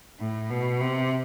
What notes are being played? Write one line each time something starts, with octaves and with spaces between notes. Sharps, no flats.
A2
B2
C3